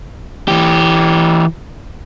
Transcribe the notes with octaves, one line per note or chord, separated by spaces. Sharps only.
E3 G4